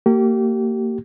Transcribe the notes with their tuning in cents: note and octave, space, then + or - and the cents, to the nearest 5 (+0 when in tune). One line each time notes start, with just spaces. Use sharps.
A#3 -30 G4 -30